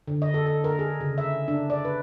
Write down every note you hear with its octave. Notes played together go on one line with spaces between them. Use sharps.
D3
D#5
A4
A4
A#4
G#4
C#3
E5
D4
D5
B4